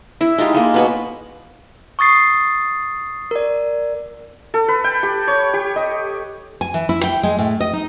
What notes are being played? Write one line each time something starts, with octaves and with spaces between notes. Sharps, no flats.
E4
G#3 D#4 F4 G4
G#3 A#3
B2 B4 C#5
C#6 D#6 A6 C7
A#4 D5
A4
B4
G5
G4
C#5
G4
D#5
G#5
E3
E4
G5
G#3
A2
D#5
D#4